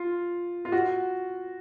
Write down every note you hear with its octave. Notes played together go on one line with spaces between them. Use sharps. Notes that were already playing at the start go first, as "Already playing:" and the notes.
Already playing: F4
F4
F#4